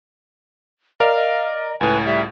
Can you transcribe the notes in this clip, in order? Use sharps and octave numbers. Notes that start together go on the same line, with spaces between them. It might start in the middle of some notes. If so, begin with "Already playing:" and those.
A#4 D5 D#5 F5
D#5
C#2 A2 B4 G#5
G3 E5